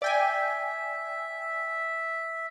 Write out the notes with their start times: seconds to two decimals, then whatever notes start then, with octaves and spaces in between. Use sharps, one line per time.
0.02 D5 E5 G5 G#5